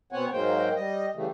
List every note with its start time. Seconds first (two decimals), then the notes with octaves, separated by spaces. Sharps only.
0.13 B2 B3 C4 C#5 F#5 G#5
0.32 G#2 F#3 G#3 A#3 C5 G5
0.75 G3 D#5
1.15 C#3 E3 G3 A3